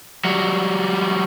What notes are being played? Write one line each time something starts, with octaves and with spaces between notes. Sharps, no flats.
F#3 G3